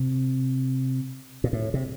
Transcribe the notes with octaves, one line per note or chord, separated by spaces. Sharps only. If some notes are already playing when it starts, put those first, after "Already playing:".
Already playing: C3
A#2
A2
C3